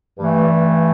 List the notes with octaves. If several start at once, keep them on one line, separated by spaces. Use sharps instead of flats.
G2 E3 A3